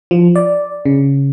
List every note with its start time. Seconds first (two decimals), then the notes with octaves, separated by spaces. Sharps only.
0.11 F3
0.36 D5
0.85 C#3